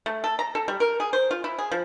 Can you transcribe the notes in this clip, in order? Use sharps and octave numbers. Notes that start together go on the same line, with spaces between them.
A3
A4
A#5
A4
G3
A#4
G#4
C5
F4
E4
G#4
F3